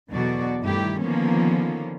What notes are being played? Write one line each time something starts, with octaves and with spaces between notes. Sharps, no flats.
E2 B2 D3 F#3 F#4 D5
G2 D#3 A3 E4 G4
D3 D#3 F3 A#3 B3 C#4